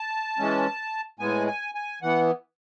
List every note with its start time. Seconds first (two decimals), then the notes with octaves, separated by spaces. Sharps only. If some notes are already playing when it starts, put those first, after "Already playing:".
Already playing: A5
0.38 E3 G#3 C#4
1.19 A2 G#3 B3 G#5
1.47 G#5
1.75 G#5
2.02 E3 B3 F#5